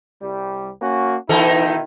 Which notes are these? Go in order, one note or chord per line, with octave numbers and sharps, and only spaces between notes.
C2 G3
A#3 C#4 F#4
B2 D#3 E3 D#4 E4 A4